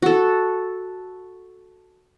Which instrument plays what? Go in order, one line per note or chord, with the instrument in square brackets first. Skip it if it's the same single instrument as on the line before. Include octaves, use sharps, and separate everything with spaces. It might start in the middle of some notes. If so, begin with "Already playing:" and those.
[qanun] F#4 A4